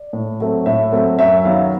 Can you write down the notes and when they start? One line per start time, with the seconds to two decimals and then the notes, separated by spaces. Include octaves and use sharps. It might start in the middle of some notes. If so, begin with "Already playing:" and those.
Already playing: D5
0.13 A2
0.40 F#3 A3 C4
0.66 A2 E5
0.92 F#3 A3 C4
1.19 F#2 E5
1.45 D#3 F#3 B3 F5